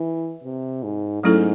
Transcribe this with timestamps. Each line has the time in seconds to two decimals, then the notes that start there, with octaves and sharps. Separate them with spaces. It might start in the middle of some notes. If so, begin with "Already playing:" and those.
Already playing: E3
0.44 C3
0.83 G#2
1.23 G#2 F#3 A3 C#4 E4 A4